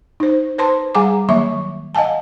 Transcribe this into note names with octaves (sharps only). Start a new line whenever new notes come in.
D#4 C5
B4 C5 A5 C6
G3 G#4 F#5 G#5 A#5 D6
D#3 F#3 A#3 E5 C#6
D#5 F5 F#5 G#5 A5